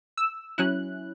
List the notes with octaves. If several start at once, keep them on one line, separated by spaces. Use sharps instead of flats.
E6
F#3 C#4 E4 F#6